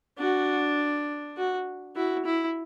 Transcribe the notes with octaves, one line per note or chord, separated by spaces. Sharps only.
D4 F#4
F#4
E4 F#4
E4